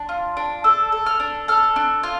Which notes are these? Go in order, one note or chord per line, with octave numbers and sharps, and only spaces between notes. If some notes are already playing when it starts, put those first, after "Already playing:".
Already playing: D4
F4
D4
A4 E6
A4
F6
D4
A4 F6
D4
F4